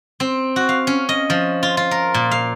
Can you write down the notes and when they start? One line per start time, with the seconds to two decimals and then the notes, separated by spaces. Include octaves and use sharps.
0.20 C4
0.56 F#4
0.69 F5
0.87 C#4
1.09 D#5
1.30 F3
1.63 F4
1.77 F4
1.91 A#4
2.14 A#2
2.31 F5